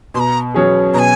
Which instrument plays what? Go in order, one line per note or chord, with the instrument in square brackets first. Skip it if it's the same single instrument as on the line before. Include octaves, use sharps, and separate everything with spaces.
[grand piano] B2 [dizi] C6
[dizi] A#5
[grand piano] F#3 C#4 G#4
[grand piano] B2 [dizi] A#5
[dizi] G#5